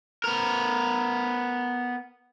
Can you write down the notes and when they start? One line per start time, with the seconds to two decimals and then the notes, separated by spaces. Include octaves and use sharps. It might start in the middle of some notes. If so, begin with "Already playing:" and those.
0.24 B3 A#4